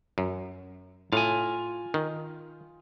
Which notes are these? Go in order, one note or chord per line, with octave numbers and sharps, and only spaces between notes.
F#2
A2 F4 G#5
D#3